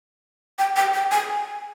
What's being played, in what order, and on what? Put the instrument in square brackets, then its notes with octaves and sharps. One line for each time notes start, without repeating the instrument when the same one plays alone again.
[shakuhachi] G5
G5
G5
G#5